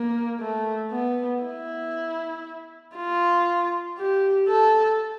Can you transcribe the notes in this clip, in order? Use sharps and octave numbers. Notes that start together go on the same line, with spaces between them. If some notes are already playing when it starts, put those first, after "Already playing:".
Already playing: A#3
A3
B3
E4
F4
G4
A4